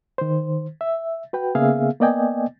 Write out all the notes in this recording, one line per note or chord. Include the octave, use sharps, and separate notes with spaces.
D#3 C5
E5
F#4 B4 G5
C#3 A#3 B3 G#4 E5 F5
A#3 B3 D5 D#5 G5 G#5